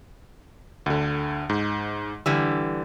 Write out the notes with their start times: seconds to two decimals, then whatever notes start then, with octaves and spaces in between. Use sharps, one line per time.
0.86 D2 D3
1.49 G#2
2.26 D3 E3 G3 E6